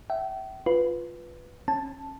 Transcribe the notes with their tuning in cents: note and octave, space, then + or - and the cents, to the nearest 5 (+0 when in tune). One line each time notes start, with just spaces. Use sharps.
E5 +0 G5 -40
F4 +5 B4 +0
C#4 -30 A5 +0